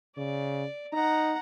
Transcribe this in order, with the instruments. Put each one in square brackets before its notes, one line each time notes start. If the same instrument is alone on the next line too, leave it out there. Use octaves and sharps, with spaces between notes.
[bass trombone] C#3 [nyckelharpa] D5
[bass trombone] D#4 [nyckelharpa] F#5 A#5